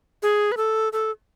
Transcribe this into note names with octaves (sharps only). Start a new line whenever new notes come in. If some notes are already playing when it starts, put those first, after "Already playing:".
G#4
B4
A4
A4